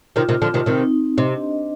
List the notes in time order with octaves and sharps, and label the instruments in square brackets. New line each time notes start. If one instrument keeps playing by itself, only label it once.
[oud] C3 D#3 [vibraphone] F4
[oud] C3 D#3
[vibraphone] F4
[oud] D3 F3
[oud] C3 D#3 [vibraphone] F4
[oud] C3 D#3 [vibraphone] C4
[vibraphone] D#4
D#4
[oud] C3 [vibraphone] D#5
[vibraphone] D4
D#5